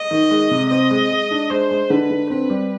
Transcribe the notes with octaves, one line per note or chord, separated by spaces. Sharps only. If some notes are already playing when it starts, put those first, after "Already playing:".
Already playing: D#5
D#3
G#3
C3
C4 D#5
G#3
G#3
D4
G#3 C5
G#3
D3 B4
D3
C4 B4
G3